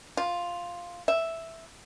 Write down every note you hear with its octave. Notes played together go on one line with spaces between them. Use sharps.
F4
E5